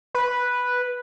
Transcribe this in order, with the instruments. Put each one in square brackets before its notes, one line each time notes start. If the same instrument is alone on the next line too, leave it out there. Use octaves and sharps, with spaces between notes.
[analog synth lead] B4